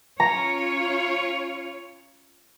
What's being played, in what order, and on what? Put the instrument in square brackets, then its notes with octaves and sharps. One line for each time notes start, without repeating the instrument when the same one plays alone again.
[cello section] C#4 F4 C#5 [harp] A#5